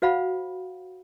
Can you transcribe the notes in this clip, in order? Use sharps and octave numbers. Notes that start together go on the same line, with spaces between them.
F#4 C5 F5 F#5 B5